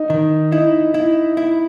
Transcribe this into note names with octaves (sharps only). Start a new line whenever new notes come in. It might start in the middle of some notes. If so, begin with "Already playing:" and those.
Already playing: D#4
D#3
D#4 E4
E4
E4